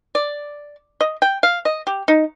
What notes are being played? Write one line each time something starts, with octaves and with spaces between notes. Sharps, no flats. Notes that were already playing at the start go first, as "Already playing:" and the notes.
D5
D#5
G5
F5
D#5
G4
D#4